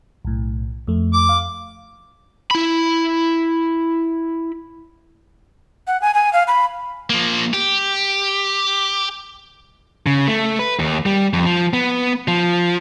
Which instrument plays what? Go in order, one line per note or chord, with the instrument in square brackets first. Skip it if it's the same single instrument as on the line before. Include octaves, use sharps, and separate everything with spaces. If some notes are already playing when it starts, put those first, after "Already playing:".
[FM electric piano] B1 A2
F2 A3
[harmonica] D6
[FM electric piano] F5
[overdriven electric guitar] E4 B5
[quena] F#5
G#5
G#5
F5
B5
[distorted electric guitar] F3 A#3
G4
[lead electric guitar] C#3
A3
B4
D#2
G3
F2
F3
B3
F3